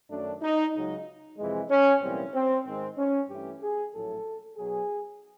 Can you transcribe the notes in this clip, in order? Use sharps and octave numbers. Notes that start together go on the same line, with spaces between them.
F#2 D#3 F#3 A3 D4
D#4
C#2 C#3 F#3 D#4
F2 C3 E3 G#3
C#4
B1 A2 E3 G3 A#3 C4
C4
G#2 D#3 G#3 C4
C#4
G2 E3 A3 G4
G#4
A#1 A2 F#3 A3 A4
B1 B2 F#3 G#4